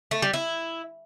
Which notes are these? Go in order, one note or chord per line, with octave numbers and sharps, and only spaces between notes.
A3
G3
E4